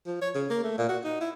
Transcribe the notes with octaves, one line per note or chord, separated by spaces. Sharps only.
F3
C#5
C#3
A#3
A3
A#2
F#4
D#4
E4